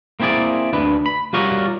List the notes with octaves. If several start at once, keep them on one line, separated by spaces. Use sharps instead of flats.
A#3 C4 E4 G#4 D5
D2 D4 B4
B5
G3 F4 F#4 A#4 C#5 D5